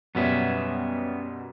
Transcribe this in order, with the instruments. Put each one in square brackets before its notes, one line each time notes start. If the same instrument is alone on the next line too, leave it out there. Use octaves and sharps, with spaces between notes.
[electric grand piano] F#2 B2 G3 [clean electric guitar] B3 C#4 E5